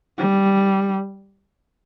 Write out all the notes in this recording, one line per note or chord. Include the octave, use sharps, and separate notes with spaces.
G3